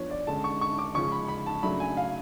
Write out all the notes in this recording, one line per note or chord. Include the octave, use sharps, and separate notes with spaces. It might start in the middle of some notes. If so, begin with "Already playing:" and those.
Already playing: F3 B3 D4 C#5
D5
D3 G#3 C#4 A5
C#6
C#6
D6
C#3 F3 G#3 C#4 C#6
B5
B5
A5
C#3 F#3 A3 D4 B5
G#5
F5